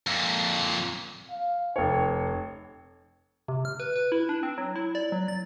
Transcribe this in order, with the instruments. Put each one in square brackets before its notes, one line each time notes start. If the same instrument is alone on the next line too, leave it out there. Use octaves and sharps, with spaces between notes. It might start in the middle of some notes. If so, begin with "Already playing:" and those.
[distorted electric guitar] F2 A#2
[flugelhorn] F5
[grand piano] F1 C#5 [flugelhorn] G5
[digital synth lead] C3
F6
B4
B4
E4
D4
C4
F#3
E4
D5
F#3
A6